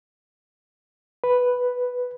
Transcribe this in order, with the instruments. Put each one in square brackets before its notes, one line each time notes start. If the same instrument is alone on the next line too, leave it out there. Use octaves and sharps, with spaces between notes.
[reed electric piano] B4